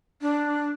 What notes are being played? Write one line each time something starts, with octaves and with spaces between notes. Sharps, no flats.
D4